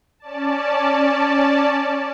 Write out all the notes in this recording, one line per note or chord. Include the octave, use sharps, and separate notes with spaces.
C#4 D5 A5